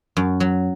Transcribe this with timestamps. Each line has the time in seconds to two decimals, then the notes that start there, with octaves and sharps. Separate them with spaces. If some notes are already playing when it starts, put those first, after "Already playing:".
0.17 F#2
0.40 F#3